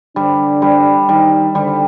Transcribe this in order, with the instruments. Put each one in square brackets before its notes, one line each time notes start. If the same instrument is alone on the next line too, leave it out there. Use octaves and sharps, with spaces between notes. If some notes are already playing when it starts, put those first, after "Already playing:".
[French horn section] D3 D4 [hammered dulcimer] G3
[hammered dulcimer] G3
[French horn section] D#3 D#4 [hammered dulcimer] G3
[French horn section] D3 D4 [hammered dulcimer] G3